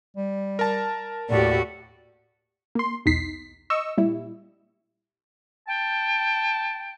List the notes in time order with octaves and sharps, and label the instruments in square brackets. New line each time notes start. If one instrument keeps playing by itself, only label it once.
[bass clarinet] G3
[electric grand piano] A#4 A5
[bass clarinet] D#2 [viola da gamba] A2 F#4 G4 [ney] D5
[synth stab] A#3 C6
B1 E2 D#4 B6 C7
D#5 C#6 E6
A#2 G3 E4
[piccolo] G5 [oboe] A5